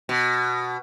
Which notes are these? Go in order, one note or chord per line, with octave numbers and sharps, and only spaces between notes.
B2